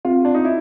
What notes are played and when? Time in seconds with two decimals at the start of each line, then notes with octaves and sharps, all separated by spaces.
0.05 C4 F4
0.25 D4
0.35 D#4
0.45 E4 D#5